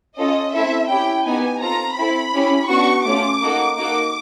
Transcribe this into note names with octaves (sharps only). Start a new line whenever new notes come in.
C#4 F4 A4 D#5
A3 C4 E4 A4 E5
C#4 E4 G4 G5
B3 D#4 G4 G#5
C4 F4 A4 A#5
C4 E4 A4 B5
C#4 E4 G4
B3 D4 F#4 C#6
A3 C#4 F4 D6
A#3 D#4 F#4 A4
A#3 D#4 F#4 A4 D6